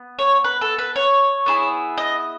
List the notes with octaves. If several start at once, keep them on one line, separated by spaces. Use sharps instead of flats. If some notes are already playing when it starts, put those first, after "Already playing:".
Already playing: B3
C#5
B4
A4
B4
C#5
B3 E4 G#4
D#5